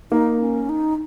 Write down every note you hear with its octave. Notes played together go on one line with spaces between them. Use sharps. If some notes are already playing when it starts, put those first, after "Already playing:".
A#3 D#4
C#4
D#4